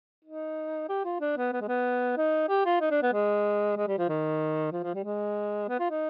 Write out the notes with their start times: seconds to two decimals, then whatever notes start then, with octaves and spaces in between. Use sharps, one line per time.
0.25 D#4
0.89 G4
1.05 F4
1.21 D4
1.37 B3
1.53 B3
1.61 G#3
1.68 B3
2.18 D#4
2.49 G4
2.66 F4
2.81 D#4
2.91 D4
3.03 B3
3.13 G#3
3.77 G#3
3.88 G3
3.99 F3
4.09 D#3
4.72 F3
4.84 F3
4.95 G3
5.04 G#3
5.69 B3
5.80 F4
5.91 D#4